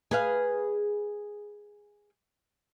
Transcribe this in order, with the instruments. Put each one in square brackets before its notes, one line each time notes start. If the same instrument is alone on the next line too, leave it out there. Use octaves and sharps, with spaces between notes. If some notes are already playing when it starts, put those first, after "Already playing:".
[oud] G#4 B4 F5